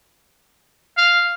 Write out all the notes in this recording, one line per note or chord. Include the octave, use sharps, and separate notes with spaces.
F5